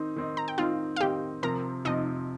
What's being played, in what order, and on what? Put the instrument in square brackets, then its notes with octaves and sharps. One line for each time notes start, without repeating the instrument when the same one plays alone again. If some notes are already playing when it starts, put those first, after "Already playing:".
Already playing: [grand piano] D#3 C4 D#4
D#3 C4 D#4
[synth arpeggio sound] A#5
G5
[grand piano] D#3 C4 D#4 [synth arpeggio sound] F4 F5
[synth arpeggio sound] F5
[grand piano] D#3 C4 D#4 [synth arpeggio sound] G4 G5
[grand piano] C3 F3 C4 [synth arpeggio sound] A#4 A#5
[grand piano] C3 F3 C4 [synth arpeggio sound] D#4 D#5